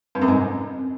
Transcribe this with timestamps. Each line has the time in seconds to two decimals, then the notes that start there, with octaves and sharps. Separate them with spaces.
0.15 G2
0.22 F#2
0.28 G#2
0.35 C3
0.41 F2